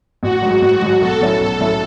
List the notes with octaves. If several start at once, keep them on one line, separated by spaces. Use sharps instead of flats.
A1 F#4
G#2 F#3
A1 F#4
G#2 F#3
B1 A4
A2 F#3 C#4 E4
B1 A4
A2 F#3 C#4 E4